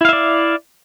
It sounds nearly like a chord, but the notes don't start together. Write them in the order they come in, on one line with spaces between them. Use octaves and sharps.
E4 F5 E5 D5